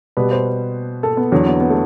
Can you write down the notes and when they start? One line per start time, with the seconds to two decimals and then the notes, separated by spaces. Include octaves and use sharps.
0.17 B2 G3 B4
0.31 C5
1.03 A4
1.17 B3
1.32 E2 D3 F#3
1.46 B3
1.60 B3
1.70 A3